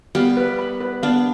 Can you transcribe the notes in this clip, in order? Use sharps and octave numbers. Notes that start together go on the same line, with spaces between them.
G3 B3 F5
B4
B5
B4
B3 D4 F5